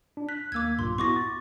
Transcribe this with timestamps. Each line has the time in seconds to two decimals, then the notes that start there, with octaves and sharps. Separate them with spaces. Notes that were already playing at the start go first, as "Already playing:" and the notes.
0.17 D4
0.29 F#6 B6
0.52 D#2 A#3 D6 E6 G#6
0.79 B1 G2 A#2 C6
0.98 B3 E4 F#4 C#6 D6 A#6
1.16 A6